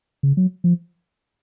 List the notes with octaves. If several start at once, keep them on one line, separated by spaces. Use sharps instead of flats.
C#3
F#3
F3